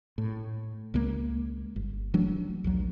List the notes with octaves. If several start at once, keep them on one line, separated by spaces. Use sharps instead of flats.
A2
C#2 G#3 A#3
G1
E3 F#3 A3 D4
A#1 D#2 F#3